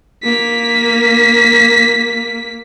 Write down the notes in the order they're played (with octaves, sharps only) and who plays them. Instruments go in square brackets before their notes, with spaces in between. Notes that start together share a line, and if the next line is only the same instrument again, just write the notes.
[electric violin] A#3 B6